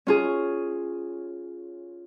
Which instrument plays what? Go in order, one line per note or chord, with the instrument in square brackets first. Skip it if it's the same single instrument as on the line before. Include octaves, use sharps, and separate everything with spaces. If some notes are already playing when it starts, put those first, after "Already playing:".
[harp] C#4 F4 G#4